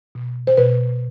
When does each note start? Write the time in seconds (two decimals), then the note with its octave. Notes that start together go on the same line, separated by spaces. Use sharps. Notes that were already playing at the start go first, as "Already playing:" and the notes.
0.15 B2
0.47 C5
0.57 B2 B4